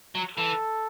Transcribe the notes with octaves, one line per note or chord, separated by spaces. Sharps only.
F#3
E3 A4